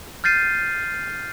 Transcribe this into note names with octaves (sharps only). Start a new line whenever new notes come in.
F6 G6 A6 C7 D#7